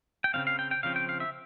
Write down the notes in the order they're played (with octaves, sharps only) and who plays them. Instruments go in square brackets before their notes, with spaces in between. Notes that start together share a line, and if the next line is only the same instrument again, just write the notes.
[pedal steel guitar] G5
C#3 F3 C4 F5
F5
G5
G5
C#3 F3 C4 F5
G5
F5
E5